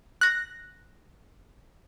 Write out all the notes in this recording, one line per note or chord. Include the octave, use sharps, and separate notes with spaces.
F#6 A#6